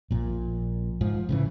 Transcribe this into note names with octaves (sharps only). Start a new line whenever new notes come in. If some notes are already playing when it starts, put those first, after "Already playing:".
A#1 A#2
G#2 F3
A2 C#3 E3